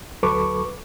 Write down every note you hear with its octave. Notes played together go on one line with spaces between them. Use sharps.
D2 F#3 A4 B4 C#6 D6